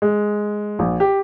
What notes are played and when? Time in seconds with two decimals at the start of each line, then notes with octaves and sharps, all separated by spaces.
0.02 G#3
0.79 A#1
1.00 G4